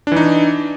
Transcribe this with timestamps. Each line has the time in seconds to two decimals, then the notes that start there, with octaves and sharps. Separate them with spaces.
0.07 D4
0.12 E3
0.16 D#4